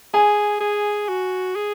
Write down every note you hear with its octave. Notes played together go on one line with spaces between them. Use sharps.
G#4 G#5
G#4
F#4
G#4